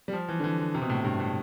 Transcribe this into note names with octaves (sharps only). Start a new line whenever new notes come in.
G3
F3
E3
D3
E3
D3
C3
B2
A2
G2
A2